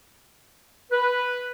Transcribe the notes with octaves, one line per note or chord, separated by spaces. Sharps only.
B4